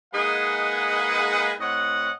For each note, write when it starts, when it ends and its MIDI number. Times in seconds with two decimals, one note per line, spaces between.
0.14 1.55 56
0.14 1.55 58
0.14 1.55 63
0.14 1.55 68
0.14 1.55 71
0.14 1.55 78
1.61 2.12 45
1.61 2.12 60
1.61 2.12 73
1.61 2.12 75
1.61 2.12 78